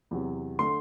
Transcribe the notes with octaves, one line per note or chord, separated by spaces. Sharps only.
E2 C3 F#3
D3 A3 C6